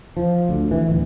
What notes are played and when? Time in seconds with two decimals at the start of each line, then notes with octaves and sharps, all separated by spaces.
0.17 F3
0.49 D2
0.71 E3
0.89 D1